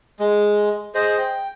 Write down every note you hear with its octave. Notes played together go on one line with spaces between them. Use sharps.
G#3
G#4 C5 D#5
G5